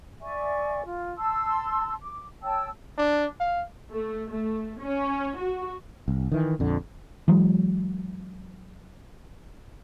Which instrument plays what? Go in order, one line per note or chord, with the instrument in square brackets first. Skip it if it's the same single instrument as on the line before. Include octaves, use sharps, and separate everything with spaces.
[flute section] D5 E5 G#5 C#6
F4
A5 C6 E6
D6
C#5 G5 A5 E6
[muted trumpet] D4
F5
[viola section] A3
A3
C#4
F#4
[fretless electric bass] C2
D#3 E3
A#1 F2 D3
[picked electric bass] E3 F#3 G#3